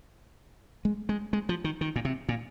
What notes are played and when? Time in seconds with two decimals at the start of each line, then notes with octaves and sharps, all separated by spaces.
0.85 G#3
1.09 G#3
1.33 G#3
1.49 F3
1.64 D#3
1.81 D#3
1.96 A#2
2.05 C3
2.29 A#2